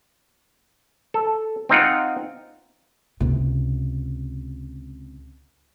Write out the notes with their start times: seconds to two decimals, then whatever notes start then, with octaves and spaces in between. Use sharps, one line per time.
1.14 A4
1.69 C4 D#4 F4 F#5
3.20 C#2 C3